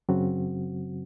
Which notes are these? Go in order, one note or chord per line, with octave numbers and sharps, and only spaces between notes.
F#2 C#3 F#3 C4 F#4